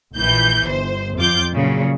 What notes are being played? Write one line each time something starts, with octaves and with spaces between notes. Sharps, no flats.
A#1 E3 G6
G1 C5
F2 F4 D6 G6
A#2 C#3 F#3